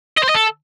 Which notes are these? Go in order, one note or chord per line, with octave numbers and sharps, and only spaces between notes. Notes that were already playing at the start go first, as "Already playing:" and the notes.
D#5
C5
D#5
A4